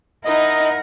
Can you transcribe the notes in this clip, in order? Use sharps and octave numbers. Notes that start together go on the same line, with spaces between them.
D#4 E4 A#4 D#5 F#5